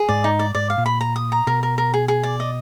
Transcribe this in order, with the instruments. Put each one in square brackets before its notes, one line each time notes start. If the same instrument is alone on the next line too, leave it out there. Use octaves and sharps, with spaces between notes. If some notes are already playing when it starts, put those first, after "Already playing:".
Already playing: [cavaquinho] G#4
[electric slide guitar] G#2 [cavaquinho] D5
[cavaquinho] D#4
D5
[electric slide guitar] G#2 [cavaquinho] D5
[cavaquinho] F5
[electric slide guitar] A#2
[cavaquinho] B5
A#5
D#6
A#5
[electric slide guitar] B2 [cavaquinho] A#4
[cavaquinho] A#4
A#4
G#4
G#4
D5
D#5